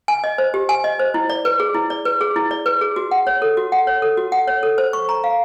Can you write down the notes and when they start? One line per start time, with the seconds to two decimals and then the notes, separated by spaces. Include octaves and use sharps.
0.08 G#5
0.24 D#5
0.38 C5
0.54 G4
0.69 G#5
0.84 D#5
0.99 C5
1.14 E4
1.30 D5
1.45 B4
1.60 G#4
1.74 E4
1.90 D5
2.05 B4
2.21 G#4
2.36 E4
2.51 D5
2.66 B4
2.81 G#4
2.96 F#4
3.11 F#5
3.27 C#5
3.42 A4
3.57 F#4
3.72 F#5
3.87 C#5
4.02 A4
4.17 F#4
4.32 F#5
4.48 C#5
4.63 A4
4.78 C5
4.93 C#6
5.09 A#5
5.24 F5